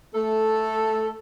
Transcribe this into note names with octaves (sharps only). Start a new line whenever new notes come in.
A3 A4